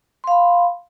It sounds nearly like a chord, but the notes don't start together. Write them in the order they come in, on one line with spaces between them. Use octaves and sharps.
C6 F5 B5